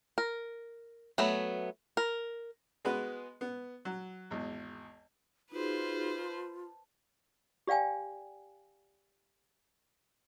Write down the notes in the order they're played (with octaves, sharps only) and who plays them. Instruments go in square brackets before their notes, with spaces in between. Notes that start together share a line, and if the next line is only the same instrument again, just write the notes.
[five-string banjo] A#4
F#3 A3 B3
A#4
[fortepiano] G#3 B3 F#4 B4
B3
F#3
G#1 E2
[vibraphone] D#4 F#4 G#4 [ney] F4 [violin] B4 C5
[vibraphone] A5
[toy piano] G4 D5 F5 G5 G#5